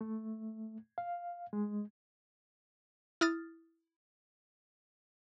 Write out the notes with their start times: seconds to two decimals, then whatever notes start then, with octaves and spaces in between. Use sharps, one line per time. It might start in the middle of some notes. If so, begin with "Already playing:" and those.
0.01 A3
0.98 F5
1.53 G#3
3.21 E4 D#6 F6 A6